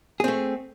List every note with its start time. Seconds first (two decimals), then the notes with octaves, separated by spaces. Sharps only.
0.20 G#4
0.24 C4
0.28 A3